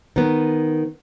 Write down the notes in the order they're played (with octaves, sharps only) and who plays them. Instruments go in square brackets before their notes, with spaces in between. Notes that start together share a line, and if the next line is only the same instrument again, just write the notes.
[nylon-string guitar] D#3 B3